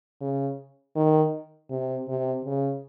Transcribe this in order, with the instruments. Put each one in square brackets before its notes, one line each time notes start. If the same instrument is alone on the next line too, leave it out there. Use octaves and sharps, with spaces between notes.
[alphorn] C#3
D#3
C3
C3
C#3